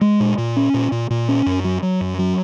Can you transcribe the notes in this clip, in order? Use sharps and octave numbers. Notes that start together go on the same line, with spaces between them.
G#3
A#2
A#2
C#4
A#2
A#2
A#2
C#4
F#2
F#3
F#3
F#2
F#3